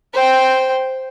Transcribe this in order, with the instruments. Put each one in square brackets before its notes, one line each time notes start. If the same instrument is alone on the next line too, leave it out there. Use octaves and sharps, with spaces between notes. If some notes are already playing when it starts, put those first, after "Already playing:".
[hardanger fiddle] C5 G5